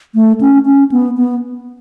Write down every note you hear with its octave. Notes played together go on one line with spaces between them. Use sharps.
A3
C#4
C#4
B3
B3